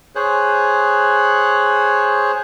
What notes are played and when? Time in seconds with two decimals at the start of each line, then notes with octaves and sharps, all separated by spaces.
0.15 G#4 C5 C#5 F#6